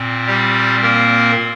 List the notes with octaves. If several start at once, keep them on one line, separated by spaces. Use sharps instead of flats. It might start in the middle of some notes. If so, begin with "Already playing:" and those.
Already playing: A#2 C4
G3 G4
A#3 A#4